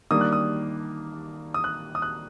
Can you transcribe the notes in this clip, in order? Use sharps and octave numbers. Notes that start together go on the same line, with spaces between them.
D#3 G3 A#3 D4 D#6
F#6
D#6
D#6
F#6
D#6
F#6